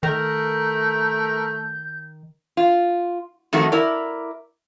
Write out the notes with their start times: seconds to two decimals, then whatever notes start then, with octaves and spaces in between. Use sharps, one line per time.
0.03 D#3 A3 A#4 G6
2.57 F4
3.53 F2 D#3 A3 D#4 F#4
3.72 E4 A#4 D5